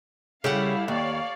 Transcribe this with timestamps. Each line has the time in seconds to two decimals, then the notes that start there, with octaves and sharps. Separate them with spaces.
0.44 C#3 G3 E4 G4 A4 F5 F#5
0.88 D#2 C#5 D5 F5